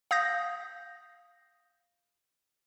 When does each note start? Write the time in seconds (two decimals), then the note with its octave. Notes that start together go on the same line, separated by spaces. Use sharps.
0.11 F5 D#6 G6 A#6